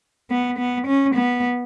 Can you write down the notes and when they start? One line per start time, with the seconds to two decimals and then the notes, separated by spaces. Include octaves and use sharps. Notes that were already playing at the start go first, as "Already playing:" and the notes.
0.30 B3
0.58 B3
0.87 C#4
1.15 B3